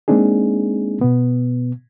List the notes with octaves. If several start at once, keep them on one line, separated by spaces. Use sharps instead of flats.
G#3 A#3 C4 D4 D#4 G#4
B2 B3